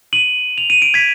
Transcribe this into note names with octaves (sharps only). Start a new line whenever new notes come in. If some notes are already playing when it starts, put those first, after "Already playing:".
D#7 F#7
F7
D#7
D7
G#6 B6